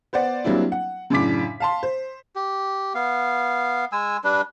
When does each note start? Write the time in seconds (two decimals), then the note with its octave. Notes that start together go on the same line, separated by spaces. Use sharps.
0.13 B3 C5 D5 F#5
0.44 F#3 G3 A#3 C4 D4 E4
0.72 F#5
1.10 F#2 A2 C#3 D4 D6 B6
1.60 F5 A5 C6
1.83 C5
2.36 G4
2.95 B3 F5
3.92 G#3 G#5 E6
4.24 G3 D4 B4